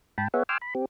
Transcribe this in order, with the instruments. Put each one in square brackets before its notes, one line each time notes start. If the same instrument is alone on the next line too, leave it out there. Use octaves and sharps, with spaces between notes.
[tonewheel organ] G#2 G5 A5 B5
B3 G#4 B4 C#5 E5 F#5
G5 G#5 C6 D6 E6 F6
B5
C4 G4